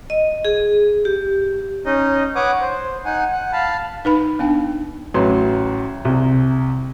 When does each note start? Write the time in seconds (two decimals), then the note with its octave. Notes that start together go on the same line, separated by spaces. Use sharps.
0.10 D#5
0.45 G#4
1.05 G4
1.86 C#4 D#4 D#5
2.36 B4 C#5 F#5 D6 D#6
2.61 C5
3.05 D#4 F#5 G#5
3.33 F#5
3.53 F5 A5 B5
4.05 D#4 B4 B5
4.39 B3 D4 G5
5.14 A1 F#3 B4 C6
6.05 C2 C3